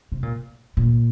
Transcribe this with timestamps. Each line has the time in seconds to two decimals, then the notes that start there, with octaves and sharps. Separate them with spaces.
0.12 C3
0.23 A#2
0.77 A#2